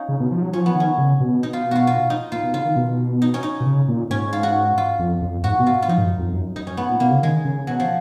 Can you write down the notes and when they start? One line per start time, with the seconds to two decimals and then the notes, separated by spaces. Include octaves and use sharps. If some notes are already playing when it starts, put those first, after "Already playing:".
Already playing: C#4 D#4 F4
0.09 C#3
0.20 B2
0.31 F3
0.42 F#3
0.53 F3 C#4
0.66 B3
0.76 D#3 C#4
0.98 C#3
1.20 B2
1.43 D#4
1.53 F4
1.71 F4 F#4
1.87 F4
2.10 D#4
2.32 A#2 F4
2.43 B2
2.54 C#3 F4
2.65 D#3
2.76 B2
3.22 D#4
3.34 C#4
3.43 D#4
3.60 B2
3.66 C#3
3.88 A#2
4.10 G#2 C#4
4.33 F4
4.43 F#4
4.78 F4
4.99 F2
5.22 F2
5.44 G#2 F#4
5.59 B2
5.67 F4
5.82 F4
5.88 F3 D#4
5.98 G#2
6.04 F#2
6.19 F2
6.33 F#2
6.55 F#2 D#4
6.67 C#4
6.77 G#2 B3
6.89 A#2
7.00 B2 A#3
7.11 C#3
7.23 D#3 G#3
7.45 C#3
7.67 B2 F#3
7.80 F3